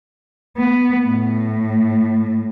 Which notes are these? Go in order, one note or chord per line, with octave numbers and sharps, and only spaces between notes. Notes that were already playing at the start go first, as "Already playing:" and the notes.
B3
A2